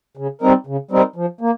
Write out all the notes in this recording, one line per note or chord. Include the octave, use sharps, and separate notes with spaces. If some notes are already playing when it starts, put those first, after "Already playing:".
C#3
G3 C4 D#4 A#4
C#3
G3 C4 D#4 A#4
F3
A#3